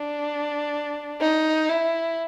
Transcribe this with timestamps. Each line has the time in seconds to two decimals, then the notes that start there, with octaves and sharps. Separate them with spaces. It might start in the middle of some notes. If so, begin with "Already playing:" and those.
Already playing: D4
1.20 D#4
1.69 E4